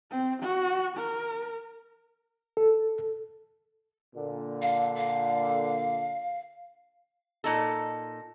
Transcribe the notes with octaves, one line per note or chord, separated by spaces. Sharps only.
C4
F#4
A#4
A4
A#2 D3
F5
F5
A#2 D#4 A4